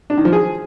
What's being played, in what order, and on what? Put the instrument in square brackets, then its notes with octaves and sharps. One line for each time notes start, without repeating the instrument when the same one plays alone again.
[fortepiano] D4
D#3
F3
G#4